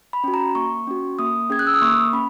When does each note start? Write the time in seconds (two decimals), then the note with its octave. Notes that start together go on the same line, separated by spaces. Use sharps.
0.13 B5
0.24 C#4 F#4
0.34 A#5
0.55 A#3 C#6
0.87 C#4 F#4
1.19 A#3 D#6
1.50 C#4 G#4 G#6
1.59 F#6
1.67 E6
1.74 D#6
1.82 A#3 C#6
2.13 C#4 B5